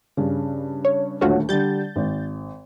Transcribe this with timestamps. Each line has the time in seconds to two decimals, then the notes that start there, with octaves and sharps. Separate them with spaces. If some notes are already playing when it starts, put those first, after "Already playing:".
0.17 G2 C#3
0.85 C#5
1.21 D#1 D2 A3 C#4 F4 F#4
1.49 D3 G3 G6 A6
1.96 G#1